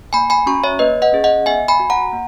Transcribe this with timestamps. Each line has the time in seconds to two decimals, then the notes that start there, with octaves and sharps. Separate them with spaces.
0.13 A#3 G#5 B5
0.30 G#5 B5
0.46 C#4 F#4 A#5 C#6
0.64 C#5 E5
0.79 A#3 B4 D#5
1.02 D#5 F#5
1.12 C#4 G#4
1.24 D#5 F#5
1.46 B3 E5 G#5
1.68 G#5 B5
1.80 F#4
1.90 F#5 A#5
2.13 A#3